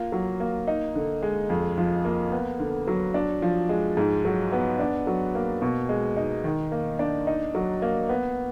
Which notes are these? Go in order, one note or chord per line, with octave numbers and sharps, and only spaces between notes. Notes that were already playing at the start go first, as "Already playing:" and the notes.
Already playing: A#3 F4
F#3
A#3
D#4
D3
G#3
F2
F3
A#3
B3
D3
F#3
D4
F3
G#3
G#2
F#3
B3
D4
F#3
A#3
B2
G#3
D#4
D#3
A#3
D4
D#4
F#3
A#3
B3